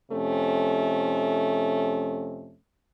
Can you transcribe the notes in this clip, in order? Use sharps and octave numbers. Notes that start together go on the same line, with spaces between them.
F2 C3 A3 C#4